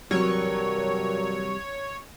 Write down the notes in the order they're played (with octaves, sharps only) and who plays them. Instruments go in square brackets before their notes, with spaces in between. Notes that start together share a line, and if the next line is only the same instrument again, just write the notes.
[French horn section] G2 A#4 [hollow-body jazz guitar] C3 E3 G3 [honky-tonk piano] F#3 [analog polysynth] C#5